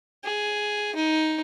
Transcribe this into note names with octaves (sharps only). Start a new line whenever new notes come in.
G#4
D#4